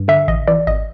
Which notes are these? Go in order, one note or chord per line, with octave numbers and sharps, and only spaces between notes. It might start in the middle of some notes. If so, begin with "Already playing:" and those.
Already playing: G2
D3 E5
A1 D#5
E3 D5
G#1 D#5